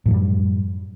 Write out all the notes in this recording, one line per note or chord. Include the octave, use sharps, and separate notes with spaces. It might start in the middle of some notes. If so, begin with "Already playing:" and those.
F#2 A2 F3 G3